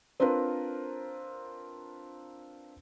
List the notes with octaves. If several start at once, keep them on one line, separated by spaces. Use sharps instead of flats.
C4 D4 F4 A#4 B4